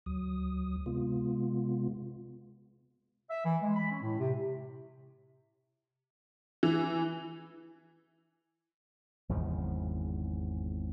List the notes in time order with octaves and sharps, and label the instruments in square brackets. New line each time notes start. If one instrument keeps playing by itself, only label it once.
[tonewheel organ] D2 F#3 D#6
C3 G#3 B3 F4
[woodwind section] E5
E3
G#3
B5
C#4
A2
C3
[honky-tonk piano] E3
[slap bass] G#1 E2 C#3 F3